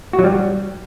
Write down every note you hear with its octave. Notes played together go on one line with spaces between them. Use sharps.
F#4
F#3
G3